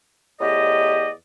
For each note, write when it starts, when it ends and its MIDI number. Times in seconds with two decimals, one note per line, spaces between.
0.41 1.10 40
0.41 1.10 45
0.41 1.10 67
0.41 1.10 74
0.41 1.10 75